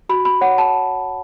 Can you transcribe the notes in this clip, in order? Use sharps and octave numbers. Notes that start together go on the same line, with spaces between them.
F#4 B5
B5
C#5 F#5
A5